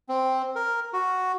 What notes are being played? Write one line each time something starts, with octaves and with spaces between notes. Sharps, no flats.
C4
A#4
F#4